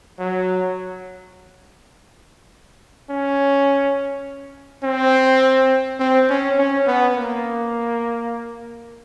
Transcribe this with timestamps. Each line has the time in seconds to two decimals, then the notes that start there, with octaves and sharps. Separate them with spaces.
0.19 F#3
3.10 C#4
4.83 C4
5.99 C4
6.29 C#4
6.58 C#4
6.87 B3
7.17 A#3